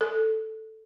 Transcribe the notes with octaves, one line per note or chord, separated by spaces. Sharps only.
A4